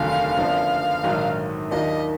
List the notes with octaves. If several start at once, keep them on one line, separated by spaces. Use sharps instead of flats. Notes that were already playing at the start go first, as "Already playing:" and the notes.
Already playing: F1 D#2 D3 F#3 F5
F#2 D3 F3 B3 D4
A#1 G#2 D#3 F#3 D4
D#2 D#3 F#3 D4 F4 D#5